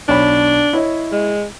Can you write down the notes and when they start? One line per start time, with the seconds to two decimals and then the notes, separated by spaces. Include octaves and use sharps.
0.08 B1 D4 C#5 B5
0.73 E4 C#5 D#5
1.12 G#3